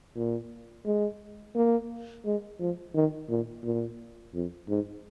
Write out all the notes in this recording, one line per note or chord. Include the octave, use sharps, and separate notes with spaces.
A#2
G#3
A#3
G#3
F3
D#3
A#2
A#2
F2
G#2